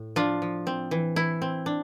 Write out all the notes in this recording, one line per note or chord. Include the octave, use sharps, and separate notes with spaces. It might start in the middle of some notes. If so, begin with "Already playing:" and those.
Already playing: A2
F3 D4 F4
F3
C4
E3
E3 E4
C4
D4